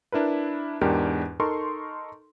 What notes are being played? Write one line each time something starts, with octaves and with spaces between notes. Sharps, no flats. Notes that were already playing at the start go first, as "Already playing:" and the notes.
D4 E4 A#4 B4
E2 G#2 D4 G4 A#4
D#4 A4 A#4 C6 C#6